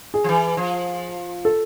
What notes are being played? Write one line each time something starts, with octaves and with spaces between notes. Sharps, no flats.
G#4
F3
E3
F3
A4